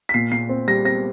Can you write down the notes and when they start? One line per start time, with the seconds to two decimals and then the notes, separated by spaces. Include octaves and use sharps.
0.09 B6
0.14 A#2 C7
0.32 A#2 C7
0.49 C4
0.68 G3 A#6
0.85 C4 A#6